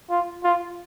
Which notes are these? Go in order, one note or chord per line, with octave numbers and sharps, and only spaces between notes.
F4
F4